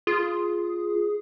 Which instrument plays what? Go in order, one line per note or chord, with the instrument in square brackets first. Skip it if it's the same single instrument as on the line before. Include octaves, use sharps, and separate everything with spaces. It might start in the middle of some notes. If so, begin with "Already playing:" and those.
[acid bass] F4 [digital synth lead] G#4